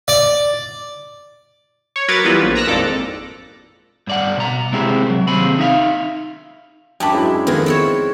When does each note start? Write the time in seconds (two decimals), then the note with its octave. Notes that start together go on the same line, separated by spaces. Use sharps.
0.08 D5
1.96 C#5
2.08 F#3 A#4 B4 D6 G#6 A6
2.24 E3 G3 B3 F4 B4
2.42 A#1
2.56 A#5 E6 F#6 A#6
2.67 G#1 F2 A#2 A4 D6
4.07 G2 D5 F#5
4.37 B2 A#5
4.72 C3 G#3 C4 E4 G4 G#4
5.10 F#3
5.28 D#2 C3 C4 G#4 B5
5.59 D#4 E5 F5
7.00 F#2 D4 G5 A5 B5 D6
7.12 F#3 G#3 E4
7.47 F2 D#3 G#3 B3
7.66 C4 E4 C#5